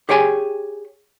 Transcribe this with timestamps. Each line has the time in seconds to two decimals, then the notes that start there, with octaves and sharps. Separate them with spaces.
0.09 G4 G#4 C#5 G5 G#5